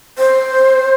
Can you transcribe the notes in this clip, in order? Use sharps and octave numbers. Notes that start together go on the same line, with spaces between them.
C5